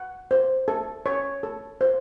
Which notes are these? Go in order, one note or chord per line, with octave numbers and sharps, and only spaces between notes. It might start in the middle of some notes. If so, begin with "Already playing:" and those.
Already playing: F#5
C5
A4
C#5
A4
C5